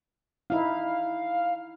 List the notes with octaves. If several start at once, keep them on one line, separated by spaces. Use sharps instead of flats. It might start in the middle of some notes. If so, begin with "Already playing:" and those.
D#4 E4 F5